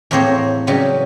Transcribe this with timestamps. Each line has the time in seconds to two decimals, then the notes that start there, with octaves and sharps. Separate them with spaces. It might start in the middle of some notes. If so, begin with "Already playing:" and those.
0.11 E2 A2 A#3 C4 C5 C#5
0.67 C#3 E3 F#3 G3